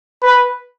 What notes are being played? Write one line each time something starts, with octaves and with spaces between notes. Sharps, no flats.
B4